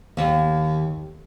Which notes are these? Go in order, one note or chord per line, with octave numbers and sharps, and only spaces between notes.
D#2